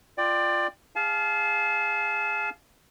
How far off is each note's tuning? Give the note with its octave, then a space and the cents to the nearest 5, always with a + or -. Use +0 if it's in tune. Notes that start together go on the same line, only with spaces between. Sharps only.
F4 +0 D5 +20 G5 +0
G#4 -30 F5 +0 A5 -35